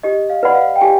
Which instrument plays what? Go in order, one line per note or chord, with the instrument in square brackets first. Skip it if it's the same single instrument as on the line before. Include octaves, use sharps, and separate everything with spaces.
[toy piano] G4 [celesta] D#5
[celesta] F5
[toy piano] B4 D5 F#5 B5
[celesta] F5
G5
[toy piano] G4 [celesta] G#5